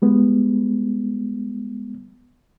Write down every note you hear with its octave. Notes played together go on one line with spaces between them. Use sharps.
G3 G#3 B3